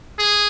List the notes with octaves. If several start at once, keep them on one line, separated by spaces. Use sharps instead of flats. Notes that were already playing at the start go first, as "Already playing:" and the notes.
G#4